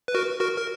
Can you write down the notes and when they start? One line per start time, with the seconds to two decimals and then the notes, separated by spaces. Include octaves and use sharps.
0.08 B4
0.15 F#4 A#4
0.40 F#4 A#4
0.58 A#4